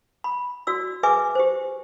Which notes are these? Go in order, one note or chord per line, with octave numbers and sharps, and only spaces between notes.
B5
F#4 D5 E6
G#4 B4 E5 G#5 D6
G4 C5